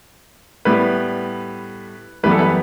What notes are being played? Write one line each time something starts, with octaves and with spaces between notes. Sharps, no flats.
A2 G3 B3 B4
F#2 E3 G3 B3 B4
A4
B4